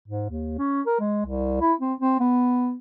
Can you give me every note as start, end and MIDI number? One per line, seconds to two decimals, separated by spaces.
0.08 0.28 44
0.30 0.53 39
0.58 0.81 61
0.86 0.96 70
0.99 1.24 56
1.26 1.57 36
1.61 1.73 64
1.80 1.94 60
2.00 2.16 60
2.20 2.75 59